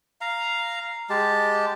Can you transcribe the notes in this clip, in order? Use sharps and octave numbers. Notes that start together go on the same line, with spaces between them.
F5 A#5
G#3 G4 A5